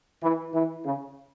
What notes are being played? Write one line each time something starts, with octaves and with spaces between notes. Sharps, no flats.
E3
E3
C#3